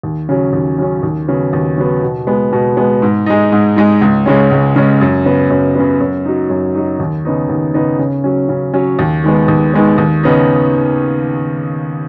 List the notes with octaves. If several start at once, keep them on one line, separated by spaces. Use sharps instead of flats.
D#2
C#3 F#3 C#4
D#2
C#3 F#3 C#4
D#2
C#3 F#3 B3
D#2
C#3 F#3 B3
B2
G#3 B3
B2
G#3 B3
G#2
G#3 D#4
G#2
G#3 D#4
C#2
C#3 G#3 C#4
C#2
C#3 G#3 C#4
F#2
C#3 B3
F#2
C#3 B3
F#2
F#3 D#4
F#2
F#3 D#4
D#2
C#3 B3 D#4
D#2
C#3 B3 D#4
C#3
F#3 C#4
C#3
F#3 C#4
D#2
D#3 G#3 B3
D#2
D#3 G#3 B3
D#2
C#3 B3 D#4